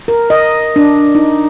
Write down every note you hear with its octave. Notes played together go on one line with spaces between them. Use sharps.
A#4
D#5
D4
D#4